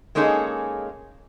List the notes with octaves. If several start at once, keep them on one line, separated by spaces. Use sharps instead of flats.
G#3 A#3 C#4 D#4 G#4 A4